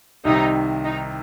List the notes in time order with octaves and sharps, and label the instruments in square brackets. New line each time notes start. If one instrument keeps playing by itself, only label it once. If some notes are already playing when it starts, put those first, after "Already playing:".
[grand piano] C2 C3 D#3 [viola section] D#4
[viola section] D#4